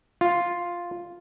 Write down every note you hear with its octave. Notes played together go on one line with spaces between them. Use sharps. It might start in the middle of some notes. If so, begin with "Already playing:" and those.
F4